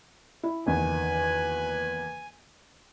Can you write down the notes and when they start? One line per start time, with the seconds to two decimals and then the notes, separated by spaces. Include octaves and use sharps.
0.43 E4
0.66 F#1 E2 D#3 B4 G#5